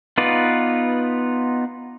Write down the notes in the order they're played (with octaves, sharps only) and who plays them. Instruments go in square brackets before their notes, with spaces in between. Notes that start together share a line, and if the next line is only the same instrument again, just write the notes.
[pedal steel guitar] B3 D#4 F4 B4 D5